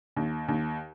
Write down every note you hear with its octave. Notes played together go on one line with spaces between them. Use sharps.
D#2
D#2